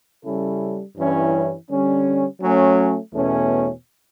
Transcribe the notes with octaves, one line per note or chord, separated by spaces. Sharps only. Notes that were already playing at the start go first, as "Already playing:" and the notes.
C#3 G3 C#4 E4 A4
G2 E3 G3 C#4 E4
D3 G3 C#4
F#3 A3 C#4
E2 B2 A3 C#4